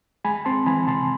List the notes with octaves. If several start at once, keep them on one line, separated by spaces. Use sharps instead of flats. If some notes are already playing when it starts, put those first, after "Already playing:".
G#3 G#5 B5
C4 A5 C6
E3 G#5 B5
C3 A5 C6